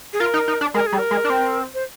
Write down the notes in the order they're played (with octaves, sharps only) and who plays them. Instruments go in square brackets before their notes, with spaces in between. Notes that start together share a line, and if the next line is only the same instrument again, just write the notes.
[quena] G#4
[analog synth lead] F4 [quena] A#4
[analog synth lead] D#4
D#4
D4
[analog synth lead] G#3 [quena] A#4
[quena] G#4
[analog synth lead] G3
[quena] A#4
[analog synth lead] G#3
D4
C4
[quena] C5